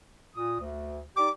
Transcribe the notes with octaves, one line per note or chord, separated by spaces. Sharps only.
A#2 D#6
D2
D#4 G4 D5 D6